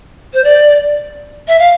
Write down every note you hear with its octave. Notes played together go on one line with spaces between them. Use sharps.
C5
D5
E5
F5